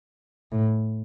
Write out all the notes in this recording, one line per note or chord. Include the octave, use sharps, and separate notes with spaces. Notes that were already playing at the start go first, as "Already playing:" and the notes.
A2